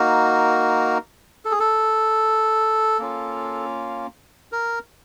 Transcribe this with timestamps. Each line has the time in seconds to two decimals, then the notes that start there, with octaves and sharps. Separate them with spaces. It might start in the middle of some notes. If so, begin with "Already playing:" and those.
Already playing: A#3 D#4 F#4 A#4
1.45 A4
1.51 G#4
1.60 A4
2.99 A#3 C#4 F4
4.52 A#4